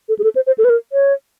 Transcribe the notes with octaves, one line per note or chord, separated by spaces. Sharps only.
A4
G#4
A4
C5
C5
A4
B4
A#4
C#5